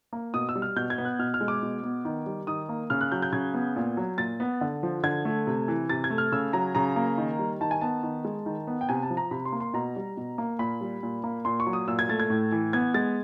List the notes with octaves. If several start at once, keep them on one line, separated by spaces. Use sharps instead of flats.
A#3
B2 D#6
E6
G3
F6
B2 G6
G#6
B3
F#6
B2 F6
F6
G#3
D6
B2
B3
D#3
G3
D#3 D#6
A#3
C#3 F6
F#6
F#3 G6
G6
C#3 G#6
B3
A#2
F#3
A#2 A6
B3
D3
F3
D3 G#6
A3
C3
E3
C3 A6
G#6
A3
F6
C#3 E6
F#3 A#5
C#3 A#5
A#3
D#3
G3
D#3 A5
G#5
B3 A5
D#3
G#3
D#3
B3
G5
C3 G#5
A5
F3
A#5
C3 B5
C6
A#3
C6
B2 A#5
G3
B2
A#3
A#2 B5
G3
A#2
A#3
A#2 C6
C#6
F#3
D#6
A#2 E6
G#6
A3 A6
G#6
A2
E3
B3 G#6
G#3 A6